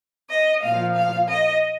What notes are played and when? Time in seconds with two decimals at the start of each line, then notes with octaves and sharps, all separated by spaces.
0.31 D#5
0.63 A#2 F3 F5
0.96 F5
1.29 D#5